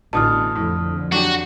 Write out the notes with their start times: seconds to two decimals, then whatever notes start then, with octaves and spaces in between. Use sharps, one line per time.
0.13 A1 B2 D3 E3 A5 D#6 F6
0.55 F2 A2 D3
1.12 F#3 D4 F#4 G4